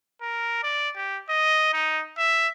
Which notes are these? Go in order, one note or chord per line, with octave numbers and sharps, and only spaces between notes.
A#4
D5
G4
D#5
D#4
E5